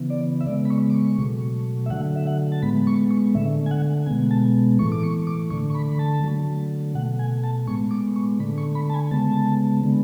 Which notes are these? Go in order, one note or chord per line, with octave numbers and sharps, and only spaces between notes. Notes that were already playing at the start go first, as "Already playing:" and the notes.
Already playing: C#3 E3 B3
D5
E5
C#3 G#3 B3 D5
B5
C#6
D6
C#6
B2 F#3 A3
E5
D3 F#3 A3 F#5
E5
F#5
A5
A2 G#3 B3 B5
C#6
C#6
D3 A3 E5
G#5
F#5
B2 G#3 B3 G#5
A5
A2 E3 A3 C#6
D6
C#6
D6
D3 A3 C#6
C#6
B5
B5
A5
D3 F#3 A3
B2 A3 F#5
G#5
A5
A2 G#3 B3 C#6
D6
C#6
D3 A3 B5
C#6
B5
A5
G#5
C#3 G#3 B3 A5
D3 G#3 B3